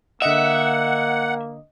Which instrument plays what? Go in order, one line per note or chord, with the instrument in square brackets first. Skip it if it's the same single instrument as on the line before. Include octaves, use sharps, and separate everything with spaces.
[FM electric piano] D3 D#5 [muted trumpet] A#3 [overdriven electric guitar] E5 [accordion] F#5